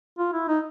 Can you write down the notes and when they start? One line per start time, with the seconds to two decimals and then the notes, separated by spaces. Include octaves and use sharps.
0.18 F4
0.33 E4
0.48 D#4